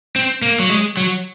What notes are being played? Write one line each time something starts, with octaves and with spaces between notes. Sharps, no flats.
C4
A#3
F#3
G#3
F#3